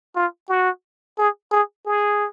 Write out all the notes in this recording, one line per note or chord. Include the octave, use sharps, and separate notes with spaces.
F4
F#4
G#4
G#4
G#4